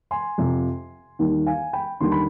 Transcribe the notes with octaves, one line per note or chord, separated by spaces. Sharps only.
G#5 C6
F2 C3 F3
D#2 D#3 G3
F5 G#5
G5 B5
D#2 D3 G3 C6
B5